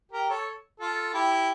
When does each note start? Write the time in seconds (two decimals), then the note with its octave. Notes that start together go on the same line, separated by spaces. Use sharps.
0.12 G4 A#4
0.30 A4 C#5
0.80 F4 A4
1.14 E4 G4